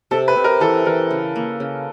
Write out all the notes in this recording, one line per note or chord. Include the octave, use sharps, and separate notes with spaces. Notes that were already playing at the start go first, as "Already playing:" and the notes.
C3 A4
B4
C3
A#4
E3 A4
E3 A#4
C#3
A#3
C#3